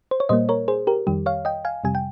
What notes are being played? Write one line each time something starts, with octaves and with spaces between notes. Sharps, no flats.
C5
C#5
A#2 G3 A#3 C5 D#5
A#4 C#5
G#4 C5
G4 A#4
F2 D#3 G3 G4
C#5 F5
D#5 G5
F5 G#5
F2 C3 G3 G#5
G5